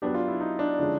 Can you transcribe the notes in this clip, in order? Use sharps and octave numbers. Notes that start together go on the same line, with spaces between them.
F#3 B3 D4 G4
F4
E4
D#4
D4
D3 F3 G#3 C#4